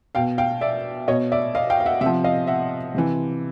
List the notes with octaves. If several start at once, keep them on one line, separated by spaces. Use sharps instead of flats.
B2 F5 G5
F5 G5
D5 E5
B2 C#5 D#5
D5 E5
D#5 F5
F5 G5
F5
E5 F#5
C3 E5 F#5
F3
D#5 F5
E5 F#5
C3 E3